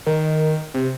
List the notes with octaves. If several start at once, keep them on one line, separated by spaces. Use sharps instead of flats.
D#3
C3